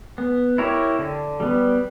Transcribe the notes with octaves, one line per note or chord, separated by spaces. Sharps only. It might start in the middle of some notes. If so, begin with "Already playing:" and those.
B3
E4 G4 A#4 C#5
D3
G3 B3